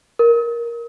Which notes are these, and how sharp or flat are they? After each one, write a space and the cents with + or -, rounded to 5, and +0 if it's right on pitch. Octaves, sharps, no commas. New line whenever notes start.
A#4 +10